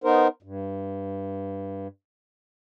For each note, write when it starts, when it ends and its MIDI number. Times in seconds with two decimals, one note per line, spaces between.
0.04 0.28 59
0.04 0.28 63
0.04 0.28 70
0.04 0.28 72
0.43 1.88 43